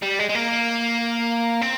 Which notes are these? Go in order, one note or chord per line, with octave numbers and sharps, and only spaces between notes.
G3
G#3
G#3
A#3
C4